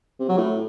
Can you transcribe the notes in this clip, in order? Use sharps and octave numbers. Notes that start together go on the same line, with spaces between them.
C3
F#3
A2